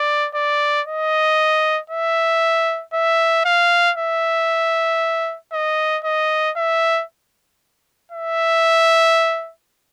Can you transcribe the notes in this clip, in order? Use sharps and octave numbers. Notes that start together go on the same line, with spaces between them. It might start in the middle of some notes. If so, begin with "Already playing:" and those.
Already playing: D5
D5
D#5
E5
E5
F5
E5
D#5
D#5
E5
E5